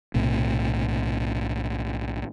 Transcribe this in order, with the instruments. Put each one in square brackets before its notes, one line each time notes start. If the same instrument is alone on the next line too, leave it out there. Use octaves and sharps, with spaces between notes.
[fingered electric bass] B1 A2 C3